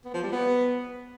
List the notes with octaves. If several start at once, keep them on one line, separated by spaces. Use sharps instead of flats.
B3
F3
G3
B3